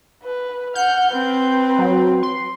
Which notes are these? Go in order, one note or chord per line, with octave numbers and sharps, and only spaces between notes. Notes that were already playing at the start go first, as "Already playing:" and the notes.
B4
F#5 F6 G6
C4 B4
F#3
C6